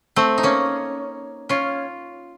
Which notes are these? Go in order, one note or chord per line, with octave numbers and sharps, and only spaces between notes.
A3 C4
D#4
A#3 C#4
C#4 F4